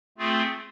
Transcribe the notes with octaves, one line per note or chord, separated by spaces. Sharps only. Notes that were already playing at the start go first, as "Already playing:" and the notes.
A3 C4 F4 G#4